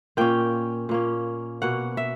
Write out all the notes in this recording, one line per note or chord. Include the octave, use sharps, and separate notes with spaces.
A#2 A#3 C#4 G5
A#2 A#3 C#4
B2 A#3 C#4 F#5
E5